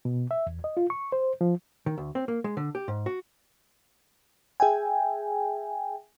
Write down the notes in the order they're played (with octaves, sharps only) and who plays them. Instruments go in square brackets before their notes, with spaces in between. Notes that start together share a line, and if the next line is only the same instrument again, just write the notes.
[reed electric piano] B2
E5
E2
D#5
F4
C#6
C5
F3
[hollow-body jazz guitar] D#3
D2
C4
A#3
G#3
D3
G4
G#2
F#4
[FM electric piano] G#4 E5 G5 G#5